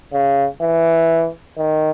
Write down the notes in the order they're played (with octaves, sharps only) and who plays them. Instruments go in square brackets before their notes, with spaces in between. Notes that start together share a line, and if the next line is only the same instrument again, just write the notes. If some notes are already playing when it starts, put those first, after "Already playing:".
[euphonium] C#3
E3
D#3